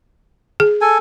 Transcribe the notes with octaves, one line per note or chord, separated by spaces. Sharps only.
G#4
A4 G#5